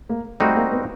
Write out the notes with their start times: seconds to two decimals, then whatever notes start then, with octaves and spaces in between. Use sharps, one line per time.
0.09 A#3
0.40 G3 A3 C4 D#4 F#4
0.56 A#3
0.72 B3